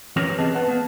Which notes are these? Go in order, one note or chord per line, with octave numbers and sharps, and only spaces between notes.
E3 C#4 G4 A#4
C3 B3 C4 G#4 D#5 A5
B4 F#5 A5
A#3 B3